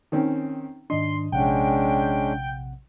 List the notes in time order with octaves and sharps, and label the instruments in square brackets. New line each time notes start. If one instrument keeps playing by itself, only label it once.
[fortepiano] D#3 C4 C#4
[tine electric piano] G#2 D#3 D4 [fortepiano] D#5 [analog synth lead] C6
[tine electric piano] A#1 C3 F#5 [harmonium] G#3 C#4 D4 [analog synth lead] G5